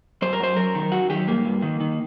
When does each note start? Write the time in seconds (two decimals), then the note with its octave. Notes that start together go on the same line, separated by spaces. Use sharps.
0.22 F#2 C5
0.33 A#4
0.40 F#2 C5
0.57 F#2 A#4
0.75 D#3
0.92 F#2 F#4
1.10 D#3 G4
1.27 G2 A#3
1.45 G2
1.62 D#3
1.80 D#3